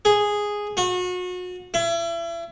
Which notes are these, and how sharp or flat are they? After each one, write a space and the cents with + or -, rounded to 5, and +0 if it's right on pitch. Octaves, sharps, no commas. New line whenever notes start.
G#4 -5
F#4 -35
E4 +35